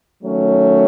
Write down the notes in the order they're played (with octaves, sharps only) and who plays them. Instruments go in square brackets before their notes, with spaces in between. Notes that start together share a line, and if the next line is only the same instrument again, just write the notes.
[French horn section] D#3 F#3 A3 C#4 C#5